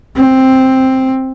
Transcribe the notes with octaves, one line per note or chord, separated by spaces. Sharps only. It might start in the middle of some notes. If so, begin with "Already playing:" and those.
C4